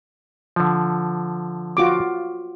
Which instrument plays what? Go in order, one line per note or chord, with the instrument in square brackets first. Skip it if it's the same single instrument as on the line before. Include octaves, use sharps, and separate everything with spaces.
[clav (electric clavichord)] D3 F3
[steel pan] F4 F#4 D6